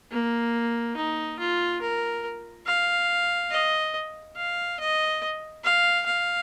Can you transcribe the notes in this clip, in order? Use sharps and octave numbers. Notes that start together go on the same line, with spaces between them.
A#3
D#4
F4
A#4
F5
D#5
F5
D#5
F5
F5